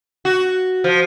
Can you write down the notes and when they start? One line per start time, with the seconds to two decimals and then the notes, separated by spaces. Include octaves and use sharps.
0.25 F#4
0.84 F3